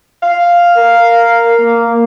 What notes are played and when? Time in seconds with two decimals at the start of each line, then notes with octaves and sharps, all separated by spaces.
0.23 F5
0.78 A#4
1.61 A#3